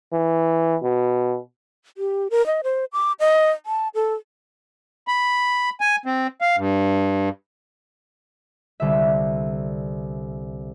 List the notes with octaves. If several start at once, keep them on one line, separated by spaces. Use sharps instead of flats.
E3
B2
G4
A#4
D#5
C5
D6
D#5
A5
A4
B5
G#5
C4
F5
G2
C2 D3 E5